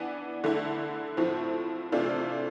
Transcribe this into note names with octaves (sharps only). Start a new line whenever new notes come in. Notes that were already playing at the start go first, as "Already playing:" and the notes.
Already playing: E3 B3 D4
D3 A3 E4
A2 F3 C4 E4
C3 E3 A3 D4 F4